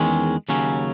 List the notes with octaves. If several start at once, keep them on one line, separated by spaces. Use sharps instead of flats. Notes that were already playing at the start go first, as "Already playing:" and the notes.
Already playing: E2 D#3 G#3 C#4
D#2 C#3 F#3 C#4